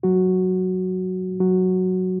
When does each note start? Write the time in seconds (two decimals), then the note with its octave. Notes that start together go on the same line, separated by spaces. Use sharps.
0.03 F#3 F#4
1.40 F#3 F#4